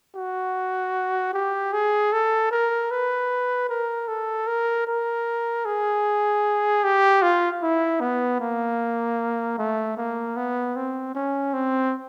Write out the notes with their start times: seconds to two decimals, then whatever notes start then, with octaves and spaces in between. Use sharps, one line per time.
0.15 F#4
1.34 G4
1.73 G#4
2.12 A4
2.51 A#4
2.91 B4
3.69 A#4
4.08 A4
4.47 A#4
4.87 A#4
5.65 G#4
6.84 G4
7.22 F4
7.62 E4
8.00 B3
8.40 A#3
9.58 A3
9.97 A#3
10.36 B3
10.76 C4
11.15 C#4
11.54 C4